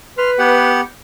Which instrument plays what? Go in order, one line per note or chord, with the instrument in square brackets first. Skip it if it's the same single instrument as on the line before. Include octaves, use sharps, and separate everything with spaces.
[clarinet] B4 [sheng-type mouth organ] C6 F6
[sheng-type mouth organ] B3 G4 F#5